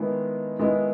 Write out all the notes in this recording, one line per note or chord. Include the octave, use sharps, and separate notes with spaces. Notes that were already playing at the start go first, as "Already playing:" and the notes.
Already playing: D#3 G#3 B3 E4
D#3 G#3 B3 E4